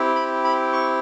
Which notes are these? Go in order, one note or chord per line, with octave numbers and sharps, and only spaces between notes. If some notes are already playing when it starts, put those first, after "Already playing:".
Already playing: C4 E4 G4
B5
B5
C#6